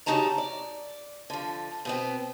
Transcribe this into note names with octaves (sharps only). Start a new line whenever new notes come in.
C#3 G3 D#4 F#4 A5 A#5
D5
D3 F3
B2 B3 C4